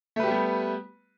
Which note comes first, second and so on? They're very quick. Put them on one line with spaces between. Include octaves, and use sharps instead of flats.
A3 B4 G4 G3 B3